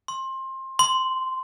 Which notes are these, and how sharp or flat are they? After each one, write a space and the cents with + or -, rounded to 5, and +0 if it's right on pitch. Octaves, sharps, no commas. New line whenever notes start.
C6 +20
C6 -10